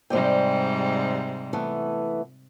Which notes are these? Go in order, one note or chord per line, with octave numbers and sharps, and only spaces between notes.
G#2 C3 G3 C5 D5 G5
E3 A3 B3